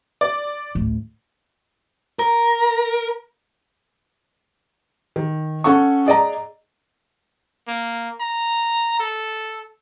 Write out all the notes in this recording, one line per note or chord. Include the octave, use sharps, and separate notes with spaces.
D5
A1 D2
A#4
D#3
C#4 A4 F#5 C#6
G#4 D5 D#5 A#5
A#3
A#5
A4